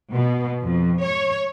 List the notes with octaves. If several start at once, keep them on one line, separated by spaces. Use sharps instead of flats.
B2
F2
C#5